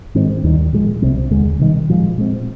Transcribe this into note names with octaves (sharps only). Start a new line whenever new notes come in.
G#2 D#3 G#3 C4
D#2 D#3 G3
A#2 F3 G#3
C2 C3 G3 C4
D#2 D3 G#3
C3 D#3 G3
A#2 F3 G#3
A#2 G#3 C4